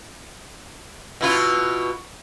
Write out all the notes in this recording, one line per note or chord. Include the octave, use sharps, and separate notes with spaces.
B2 E4 F4